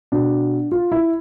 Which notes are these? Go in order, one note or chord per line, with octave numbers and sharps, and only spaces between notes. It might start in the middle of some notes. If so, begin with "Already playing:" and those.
B2 D4
F4
E4